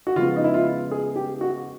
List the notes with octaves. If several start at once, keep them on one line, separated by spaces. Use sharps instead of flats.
F#4
C#3 F3 G#3 B3 F4
D#4
E4
F4
G#4
G4
F#4